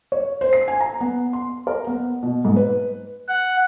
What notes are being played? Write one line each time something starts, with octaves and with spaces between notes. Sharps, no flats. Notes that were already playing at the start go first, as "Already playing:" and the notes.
C#5
C5
C7
G#5
A#5
B3
C6
A#4
B3
B2
G#2
B4
F#5